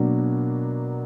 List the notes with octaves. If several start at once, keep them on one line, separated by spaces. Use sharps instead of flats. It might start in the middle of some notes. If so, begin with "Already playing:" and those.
Already playing: B2 F#3 A#3 D4